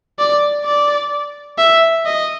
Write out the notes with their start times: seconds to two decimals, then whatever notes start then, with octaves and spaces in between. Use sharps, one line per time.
0.19 D5
0.65 D5
1.58 E5
2.05 D#5